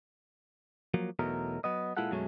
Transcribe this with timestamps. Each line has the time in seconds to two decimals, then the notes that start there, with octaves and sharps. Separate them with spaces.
0.94 F3 F#3 A#3
1.19 E2 B2 F#3 A3 D#4 A#4
1.64 F#3 B3 D#5
1.97 A#2 G#3 E4 F4 A4 F#5
2.11 F#2 B2 F#3 G#3 A3 C#4